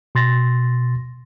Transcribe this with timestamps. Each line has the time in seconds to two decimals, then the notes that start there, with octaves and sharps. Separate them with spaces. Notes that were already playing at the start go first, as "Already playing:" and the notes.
0.15 B2 C6 A6 A#6